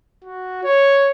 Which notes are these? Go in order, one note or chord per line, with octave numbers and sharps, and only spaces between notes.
F#4
C#5